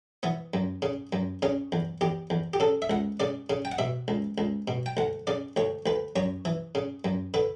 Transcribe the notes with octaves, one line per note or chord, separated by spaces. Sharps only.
E3 B3
F#2
C#3
F#2
C#3 C#4
E2
E2 G4
E2
G4
C#3 A4
E5
C#2 F#5
C#3 D5
C#3
G5
F#5
B2 E5
C#2
C#2
B2
G5
D2 F#5
C#3 D5
D2 C#5
D2 B4
F#2 C#5
E3
C#3
F#2
D3 B4